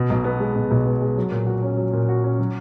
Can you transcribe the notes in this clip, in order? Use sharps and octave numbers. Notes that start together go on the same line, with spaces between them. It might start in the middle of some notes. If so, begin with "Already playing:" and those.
Already playing: B2
B1
B3
G#3
B2
B1
B3
G#3
F#3
A#2
F#4
C#4
F#3
A#2
F#4
C#4
F#3